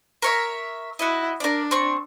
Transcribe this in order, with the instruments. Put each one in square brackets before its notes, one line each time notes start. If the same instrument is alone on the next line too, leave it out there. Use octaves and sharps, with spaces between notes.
[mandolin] A#4 C#5 E5
[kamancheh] E4 [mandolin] F#4 D#5
[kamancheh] D4 [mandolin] A#4 D5
[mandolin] C4 C#6